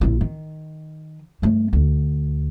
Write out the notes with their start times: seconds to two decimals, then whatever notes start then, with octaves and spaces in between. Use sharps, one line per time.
0.01 A#1 E4
0.21 D#3
1.42 G2 A3
1.73 D2